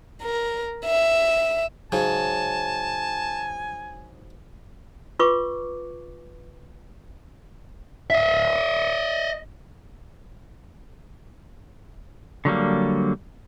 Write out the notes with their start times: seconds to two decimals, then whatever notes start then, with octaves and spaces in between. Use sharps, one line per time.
0.22 A#4
0.86 E5
1.92 G#2 C#3 F#3 G#5 A5
5.19 F4 B4 C#6 D6
8.10 D#5 E5
12.45 D3 F#3 G3 A#3